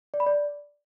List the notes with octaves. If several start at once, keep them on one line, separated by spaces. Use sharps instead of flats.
D5
B5
D5